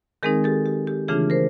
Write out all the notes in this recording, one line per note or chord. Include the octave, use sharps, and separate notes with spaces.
D#3 G#3 C4 D#4 G#4 A#4
G4 A4
G4
G4
C#3 E3 A3 D4 F4 G#4
A#4 C5